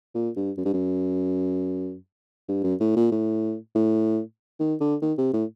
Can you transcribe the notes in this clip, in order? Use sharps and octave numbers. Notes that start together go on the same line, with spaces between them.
A#2
G2
F#2
G2
F#2
G2
F#2
A2
A#2
A2
A2
D#3
D3
D#3
C3
A2